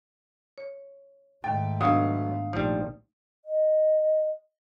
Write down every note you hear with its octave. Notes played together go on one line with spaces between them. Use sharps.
C#5
G#2 D#3 A3 G5 A6
B1 F#3 B3 D4 F5 D#6
A#1 F3 G3 A3 D#4
D#5